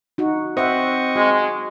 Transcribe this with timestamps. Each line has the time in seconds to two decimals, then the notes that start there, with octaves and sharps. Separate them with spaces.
0.18 D#4 F#4
0.57 C4 C5 D#5 E5 F#5 C#6
1.16 G#3 F#4